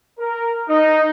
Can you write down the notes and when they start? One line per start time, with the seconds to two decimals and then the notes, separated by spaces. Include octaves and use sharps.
0.18 A#4
0.69 D#4